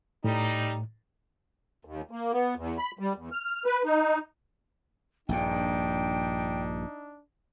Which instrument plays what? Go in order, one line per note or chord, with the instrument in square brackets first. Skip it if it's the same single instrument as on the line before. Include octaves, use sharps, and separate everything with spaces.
[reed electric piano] A2 [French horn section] G3 D#4
[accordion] D#2
A#3
B3
E2
B5
G3
E2
F6
B4
D#4
[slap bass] A#1 G2 A#2 [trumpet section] D4 D#4 [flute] G5